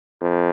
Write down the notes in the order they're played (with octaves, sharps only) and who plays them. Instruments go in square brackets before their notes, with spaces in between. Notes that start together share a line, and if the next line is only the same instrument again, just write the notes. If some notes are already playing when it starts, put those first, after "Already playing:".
[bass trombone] F2